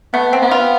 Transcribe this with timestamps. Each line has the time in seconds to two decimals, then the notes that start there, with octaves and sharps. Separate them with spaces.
0.14 A3 B3
0.33 C4
0.42 B3
0.51 F4